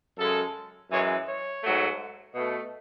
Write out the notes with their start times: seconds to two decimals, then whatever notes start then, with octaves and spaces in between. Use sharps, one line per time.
0.18 F#2 C#3 G#3 A4
0.90 F#2 E3 G#3 C#5
1.27 C#5
1.63 G#2 F#3 A3
2.35 B2 A3